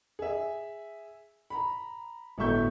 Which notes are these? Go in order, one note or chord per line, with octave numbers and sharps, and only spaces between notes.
G#4 E5
A#5 B5
G1 A2 F#3 E5 C#6 G6